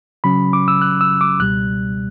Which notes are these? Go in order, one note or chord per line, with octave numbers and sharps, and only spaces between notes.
C#3 F#3 C#4 B5
D6
E6
F#6
E6
D6
C#2 B2 G3 F#6